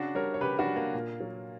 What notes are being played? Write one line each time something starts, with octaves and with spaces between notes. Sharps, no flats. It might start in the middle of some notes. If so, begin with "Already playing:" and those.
Already playing: C#3 D4 F#4
G3 A#4 C#5
C#5
C#3 G4 B4
D4 F#4
G3
A#3
A#2
F#3